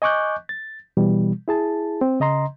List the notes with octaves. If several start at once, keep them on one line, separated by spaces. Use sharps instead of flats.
D#5 G#5 C#6 D6 F#6 G6
A6
B2 E3 G3
E4 G#4 A5
C4
C#3 D#5 A#5 C6